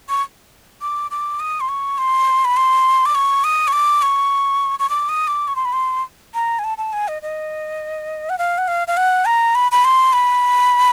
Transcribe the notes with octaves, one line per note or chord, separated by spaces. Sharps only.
C#6
D6
D6
D#6
C6
C#6
C6
B5
C6
D6
C#6
D#6
C#6
D6
C#6
C#6
D6
D#6
D6
C#6
C6
B5
C6
A#5
G#5
A5
A5
G#5
D#5
D#5
F#5
F5
F#5
F5
F5
F#5
A#5
B5
B5
C6
B5